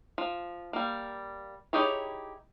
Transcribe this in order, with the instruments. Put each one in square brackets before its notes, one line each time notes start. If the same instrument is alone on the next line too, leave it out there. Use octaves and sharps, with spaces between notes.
[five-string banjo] F3
G3 A#3
D#4 E4 G4 G#4 C#5